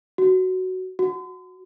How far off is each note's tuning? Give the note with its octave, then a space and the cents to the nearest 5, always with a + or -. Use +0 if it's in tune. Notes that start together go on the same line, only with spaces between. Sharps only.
F#4 +10
F#4 -10